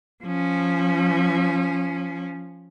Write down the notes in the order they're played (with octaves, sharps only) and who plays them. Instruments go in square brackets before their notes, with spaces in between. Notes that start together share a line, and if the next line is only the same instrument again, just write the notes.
[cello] F3 C#4